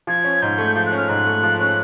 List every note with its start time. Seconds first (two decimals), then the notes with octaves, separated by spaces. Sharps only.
0.07 F3 G#6
0.24 C#4
0.42 G#2 G6
0.58 A3
0.76 F3 G6
0.86 F#6
0.92 C#4 F6
1.09 G#2 F#6
1.27 A3
1.43 F3
1.60 C#4